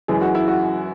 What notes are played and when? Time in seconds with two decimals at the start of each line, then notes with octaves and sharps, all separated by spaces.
0.08 F#2 E3 G#3 G#4
0.21 F#4
0.35 E4
0.48 F#4